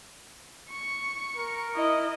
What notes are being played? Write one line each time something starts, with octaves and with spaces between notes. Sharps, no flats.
C#6
A#4
E4 D#5